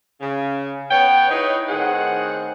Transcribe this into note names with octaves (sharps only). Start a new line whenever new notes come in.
C#3
B3 C#5 G5
D#4 E4 G#4 B4 C#5 D#5
A2 D#3 C4 G#4 F#5